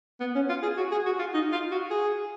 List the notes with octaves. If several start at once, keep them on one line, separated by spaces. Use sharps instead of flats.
B3
C#4
F4
G#4
F#4
G#4
F#4
F4
D#4
F4
F#4
G#4